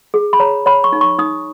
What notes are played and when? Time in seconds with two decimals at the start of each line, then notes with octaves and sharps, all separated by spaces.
0.14 G#4
0.33 B5
0.40 C#5 A#5
0.66 C#5 B5
0.84 C#6
0.93 D#4
1.01 C#6
1.18 D#4 D#6